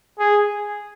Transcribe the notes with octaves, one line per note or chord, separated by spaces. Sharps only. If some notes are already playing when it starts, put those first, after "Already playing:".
G#4